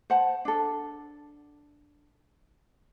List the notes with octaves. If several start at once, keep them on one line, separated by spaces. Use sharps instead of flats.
C5 F#5 A5
D4 A4